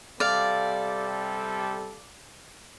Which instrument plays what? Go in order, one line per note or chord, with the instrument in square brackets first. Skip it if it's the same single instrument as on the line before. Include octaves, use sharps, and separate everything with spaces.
[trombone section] C3 G3 A4 [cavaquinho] D5 F5